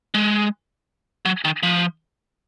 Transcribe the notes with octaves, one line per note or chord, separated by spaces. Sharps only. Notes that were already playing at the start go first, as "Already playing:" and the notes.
G#3
F#3
D#3
F3